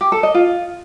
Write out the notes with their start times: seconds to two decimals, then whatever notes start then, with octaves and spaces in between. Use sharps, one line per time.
0.01 G4
0.12 A4
0.23 D#5
0.34 F4